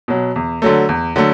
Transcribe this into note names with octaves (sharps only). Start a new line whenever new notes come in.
B2 F#3
E2
D3 F#3 A3
E2
D3 F#3 A3